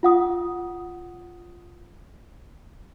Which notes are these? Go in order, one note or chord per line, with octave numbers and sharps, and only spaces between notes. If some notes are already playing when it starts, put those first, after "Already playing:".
F4 F#5 D#6